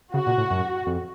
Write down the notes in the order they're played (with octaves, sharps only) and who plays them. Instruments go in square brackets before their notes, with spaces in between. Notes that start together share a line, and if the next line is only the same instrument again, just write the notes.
[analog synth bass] C#3 [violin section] F#4
[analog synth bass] A#2
A2
F#2
F2